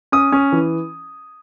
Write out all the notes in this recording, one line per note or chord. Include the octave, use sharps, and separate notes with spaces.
C#4 D#6
C#4
E3